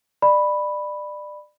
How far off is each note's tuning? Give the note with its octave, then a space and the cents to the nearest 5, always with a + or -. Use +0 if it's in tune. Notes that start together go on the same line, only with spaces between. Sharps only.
D5 +25 B5 +0